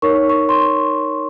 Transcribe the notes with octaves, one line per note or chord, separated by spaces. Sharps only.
D#4 A#4 C#5 C#6
C#6
C6